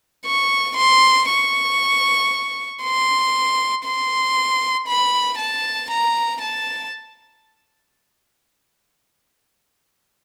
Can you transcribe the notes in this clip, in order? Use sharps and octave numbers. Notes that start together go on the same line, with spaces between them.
C#6
C6
C#6
C6
C6
B5
A5
A#5
A5